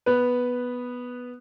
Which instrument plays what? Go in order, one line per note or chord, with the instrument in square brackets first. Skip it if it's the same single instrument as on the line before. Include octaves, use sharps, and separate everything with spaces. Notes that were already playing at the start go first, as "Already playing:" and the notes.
[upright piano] B3 B4